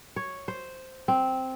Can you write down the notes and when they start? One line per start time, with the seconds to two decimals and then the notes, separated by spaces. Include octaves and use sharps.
0.16 C#5
0.48 C5
1.08 C4